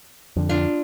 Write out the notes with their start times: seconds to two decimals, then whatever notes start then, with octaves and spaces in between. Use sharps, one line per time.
0.36 F2 D3
0.49 D4 F4